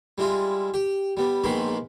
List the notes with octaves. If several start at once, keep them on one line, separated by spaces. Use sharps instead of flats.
G3 G#3 E4 F4
G4
G3 B3
A#1 G#2 D#3 B3 B5 C6